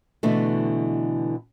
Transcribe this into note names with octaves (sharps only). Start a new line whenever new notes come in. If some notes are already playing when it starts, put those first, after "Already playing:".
B2 D3 E3 A3